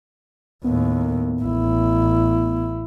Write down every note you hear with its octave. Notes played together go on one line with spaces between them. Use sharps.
D#2 A2 B3
A1 E4